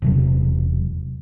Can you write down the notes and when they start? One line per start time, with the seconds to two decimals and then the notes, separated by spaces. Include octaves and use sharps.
0.02 E1 C3 F#3